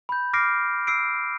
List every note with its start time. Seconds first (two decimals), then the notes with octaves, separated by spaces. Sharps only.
0.09 B5 G6
0.33 D6 F6 A#6 C7 D7
0.87 E6 C7 D7